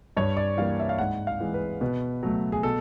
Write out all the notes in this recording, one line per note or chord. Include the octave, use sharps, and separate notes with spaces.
G2 C#5
D5
E3 G3 A#3 F5
E5
F5
G#2 F#5
F5
E3 G#3
B4
B2 B4
F#3 A3
G#4
B2 A4